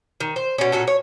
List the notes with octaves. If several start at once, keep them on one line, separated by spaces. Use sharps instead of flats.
D#3
C5
B2 C#4
A#2 C#4 F#4 A4
C#5